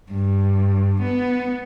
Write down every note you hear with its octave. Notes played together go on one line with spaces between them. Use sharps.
G2
B3